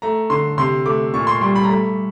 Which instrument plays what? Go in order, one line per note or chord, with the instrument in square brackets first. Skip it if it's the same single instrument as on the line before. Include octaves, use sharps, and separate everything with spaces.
[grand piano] A3 A#5
D3 C6
C3 C6
A3 D6
A#2 C#6
C6
G3 C6
B5
A#5
A3 B5